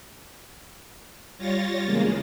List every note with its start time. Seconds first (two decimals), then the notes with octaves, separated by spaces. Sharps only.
1.38 G3 F4 C#5 A6 A#6
1.85 E2 C#3 G#3 A#3